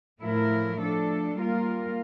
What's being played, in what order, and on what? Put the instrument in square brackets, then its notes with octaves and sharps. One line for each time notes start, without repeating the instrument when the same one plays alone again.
[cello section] A2 F3 A3 E4 A#4
F3 A3 D4 A4
G3 A#3 F4 A#4